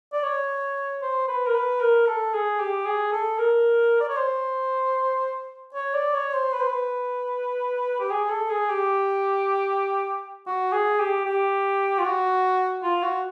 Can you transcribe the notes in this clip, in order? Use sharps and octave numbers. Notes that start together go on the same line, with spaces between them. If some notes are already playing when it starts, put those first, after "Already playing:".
D5
C#5
C5
B4
A#4
B4
A#4
A4
G#4
G4
G#4
A4
A#4
D5
C#5
C5
C#5
D5
C#5
C5
B4
C5
B4
G4
G#4
A4
G#4
G4
F#4
G#4
G4
G4
F4
F#4
F4
F#4